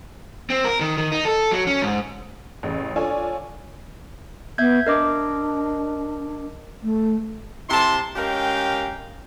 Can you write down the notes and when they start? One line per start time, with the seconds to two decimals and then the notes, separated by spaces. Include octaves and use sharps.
0.50 C4
0.65 A#4
0.81 D#3
0.97 D#3
1.12 D#4
1.25 A4
1.52 F#3
1.67 C#4
1.82 G#2
2.63 A1 C#3
2.96 D4 F4 A4 C#5 D5 G#5
4.58 B3 E5 G6 G#6
4.87 D4 A#4 D#5 D6
6.83 A3
7.69 C3 C4 E4 A5 C6
8.16 G#3 C#4 G4 A#4 F5 G5